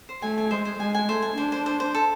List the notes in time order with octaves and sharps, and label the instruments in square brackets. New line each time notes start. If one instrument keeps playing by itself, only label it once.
[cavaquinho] C5
[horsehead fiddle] A3 [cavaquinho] G#5
[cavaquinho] G#5
[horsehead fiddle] G#3 [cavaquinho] C5
[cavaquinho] C5
[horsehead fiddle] G#3 [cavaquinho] G#5
[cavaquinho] G#5
[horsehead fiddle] A3 [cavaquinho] C5
[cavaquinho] G#5
[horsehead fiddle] D4 [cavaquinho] C5
[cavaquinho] C5
C5
C5
A4